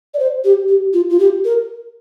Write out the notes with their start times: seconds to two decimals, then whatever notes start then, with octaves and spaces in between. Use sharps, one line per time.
0.14 D5
0.19 C5
0.44 G4
0.68 G4
0.93 F4
1.10 F4
1.19 G4
1.45 A#4